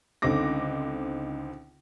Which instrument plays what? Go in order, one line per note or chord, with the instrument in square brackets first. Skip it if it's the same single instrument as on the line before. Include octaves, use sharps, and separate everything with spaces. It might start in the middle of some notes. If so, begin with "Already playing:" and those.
[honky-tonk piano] C#2 D3 C4 D#4 D6 A#6